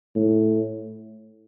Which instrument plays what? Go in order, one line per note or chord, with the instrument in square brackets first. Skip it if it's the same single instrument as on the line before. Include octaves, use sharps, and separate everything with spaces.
[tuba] A2